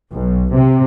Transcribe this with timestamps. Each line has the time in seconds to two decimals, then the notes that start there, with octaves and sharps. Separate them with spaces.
0.11 B1
0.52 C3